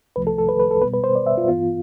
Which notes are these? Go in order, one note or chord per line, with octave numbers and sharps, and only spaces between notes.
C2 C3 F3 A3 B4
A4
A4
B4
B4
A4
B2 G3 B3 B4
B4
C5
D5
E5
F4
G2 E3 B3 F4